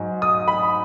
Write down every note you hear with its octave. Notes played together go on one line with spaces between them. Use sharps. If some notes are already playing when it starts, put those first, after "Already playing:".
Already playing: G#2 F#3
D#6
B5